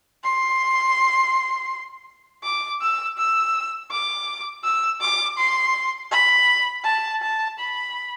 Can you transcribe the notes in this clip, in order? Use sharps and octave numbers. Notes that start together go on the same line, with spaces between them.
C6
D6
E6
E6
D6
E6
D6
C6
B5
A5
A5
B5